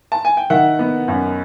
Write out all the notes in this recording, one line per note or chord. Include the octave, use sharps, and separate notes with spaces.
A5
G#5
G5
D#3 E5 F#5
B3
F#2